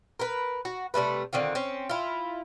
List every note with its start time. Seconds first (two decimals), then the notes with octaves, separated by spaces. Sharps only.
0.19 A#4 B4
0.65 F#4
0.94 C3 G3 A3 B4
1.33 D3 D#3 C4 F4
1.55 C4 C#4
1.89 E4 F4